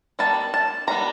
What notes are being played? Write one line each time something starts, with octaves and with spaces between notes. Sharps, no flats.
D#3 G3 B3 A5
A5
D#3 G3 B3 A#5